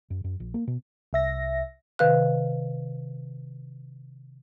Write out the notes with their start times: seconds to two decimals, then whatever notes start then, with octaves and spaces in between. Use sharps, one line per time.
0.10 F#2
0.24 F#2
0.40 A#1
0.54 A#3
0.67 B2
1.13 C2 E5 A#6
1.99 C3 D#3 B4 F5 F#6